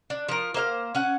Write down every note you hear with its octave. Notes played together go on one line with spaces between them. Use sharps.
D4
F3 A#4
A#3 C5 E5 F5
C#4 F#5